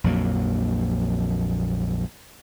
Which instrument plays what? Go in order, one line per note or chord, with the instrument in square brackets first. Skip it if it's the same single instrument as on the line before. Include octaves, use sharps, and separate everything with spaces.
[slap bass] A#1 F2 F#3 A#3